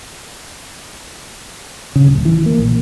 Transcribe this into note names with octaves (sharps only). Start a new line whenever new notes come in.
C#3
D1
E3
A#3
A#1